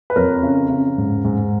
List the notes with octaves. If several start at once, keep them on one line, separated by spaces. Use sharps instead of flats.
B4
F2 A#4 C#5
C#3
C#3
G#2
G#2